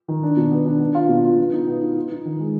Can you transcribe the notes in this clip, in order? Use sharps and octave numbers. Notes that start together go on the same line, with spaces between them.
D#3
D4
B2
B3
D4
B3
F4
B2
F4
B2
D#4
B3
D#4
D#4
D#4
D#3
G#3